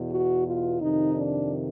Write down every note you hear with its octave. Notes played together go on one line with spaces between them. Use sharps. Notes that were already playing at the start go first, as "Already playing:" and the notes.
Already playing: E2 B2
F#4
F4
F2 C3 D#3 D#4
D4